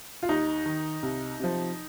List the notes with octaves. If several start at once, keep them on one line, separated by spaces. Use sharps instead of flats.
F4
D#2 D#4
D#3
C2
C3 F3